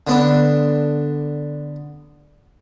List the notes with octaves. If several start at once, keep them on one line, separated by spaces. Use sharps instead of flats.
D3 B3 D4